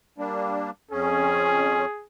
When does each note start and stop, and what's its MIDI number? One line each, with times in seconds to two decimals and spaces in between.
0.18 0.71 55
0.18 0.71 58
0.18 0.71 62
0.91 1.85 41
0.91 1.85 61
0.91 2.05 68